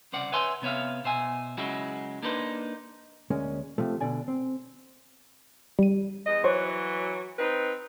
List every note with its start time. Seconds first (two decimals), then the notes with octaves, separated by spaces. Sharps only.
0.12 C2 C#3 C5 D5 F#5
0.32 B4 C#5 E5 G#5 C6
0.62 C3 B3 C#5 E5 F5
1.05 B2 C5 E5 G#5
1.57 C#3 F#3 G#3 E4 F#4
2.22 A#3 D4 D#4 B4 C5
3.30 D2 G#3 A#3 C#4
3.78 C3 F3 A3
4.01 B2 D3 D5 G#5
4.28 C4
5.79 G3 D#7
6.26 E2 D#5
6.44 E3 F#3 C5 C#5 C#6
7.39 C4 D#4 B4